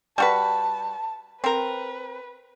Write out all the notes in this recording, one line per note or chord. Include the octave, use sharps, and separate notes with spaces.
G3 F#4 B4 A5
C4 A#4 B4